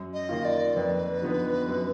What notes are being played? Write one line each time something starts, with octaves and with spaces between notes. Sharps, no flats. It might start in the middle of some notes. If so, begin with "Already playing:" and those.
Already playing: F#2
D#5
D#3 A#3 F4
D5
F2 B4
D3 F3 B3 D#4
F#2